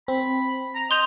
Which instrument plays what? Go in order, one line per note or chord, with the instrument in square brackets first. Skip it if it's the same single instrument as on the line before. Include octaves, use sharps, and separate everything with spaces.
[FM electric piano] C4 [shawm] B5
[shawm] A#5
[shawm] D#5 [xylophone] C6 G6 F7